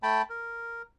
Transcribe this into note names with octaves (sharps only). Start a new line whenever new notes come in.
A3 G5 A5 B5
A#4